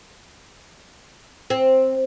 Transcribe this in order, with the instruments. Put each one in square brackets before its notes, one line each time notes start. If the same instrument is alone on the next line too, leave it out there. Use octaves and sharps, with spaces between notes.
[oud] C4